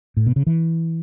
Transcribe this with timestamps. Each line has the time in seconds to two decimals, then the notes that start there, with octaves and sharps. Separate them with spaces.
0.17 A2
0.27 B2
0.36 C#3
0.47 E3